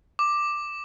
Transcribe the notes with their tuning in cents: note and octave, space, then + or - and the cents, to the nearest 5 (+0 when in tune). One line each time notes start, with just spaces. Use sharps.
D6 +10